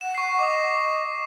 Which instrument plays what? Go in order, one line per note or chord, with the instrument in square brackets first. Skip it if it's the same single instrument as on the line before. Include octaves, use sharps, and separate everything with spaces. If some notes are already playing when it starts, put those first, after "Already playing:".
[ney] F#5 [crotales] E7
[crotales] C#6 C7
[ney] D#5 [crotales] D6 D#6